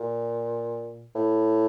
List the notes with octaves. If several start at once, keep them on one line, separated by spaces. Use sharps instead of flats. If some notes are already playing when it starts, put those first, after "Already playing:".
Already playing: A#2
A2